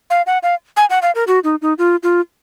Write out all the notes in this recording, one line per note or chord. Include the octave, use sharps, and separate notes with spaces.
F5
F#5
F5
G#5
F#5
F5
A#4
F#4
D#4
D#4
F4
F4